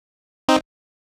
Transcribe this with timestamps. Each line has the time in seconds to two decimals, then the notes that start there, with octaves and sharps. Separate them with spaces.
0.48 C4 D#4